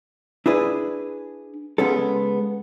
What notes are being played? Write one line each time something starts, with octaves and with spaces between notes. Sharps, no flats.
D4 E4 G#4 B4
C#3 G#3 B3 C#4 A4